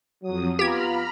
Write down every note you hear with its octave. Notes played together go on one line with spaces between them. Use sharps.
F2 F#3 D#6
B3 F4 G4 A#5 B5 F6 G#6